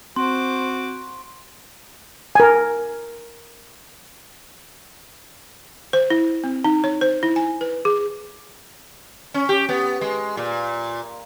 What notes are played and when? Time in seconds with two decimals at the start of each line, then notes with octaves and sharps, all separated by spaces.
0.16 C4 F#4 C5 C6 D6
2.35 A#4 G#5
5.93 C5
6.10 E4
6.44 C4
6.65 D#4
6.84 C#5
7.01 C5
7.23 E4
7.36 G#5
7.61 B4
7.85 G#4
9.34 C#4
9.49 G4
9.69 B3
10.01 G#3
10.37 A#2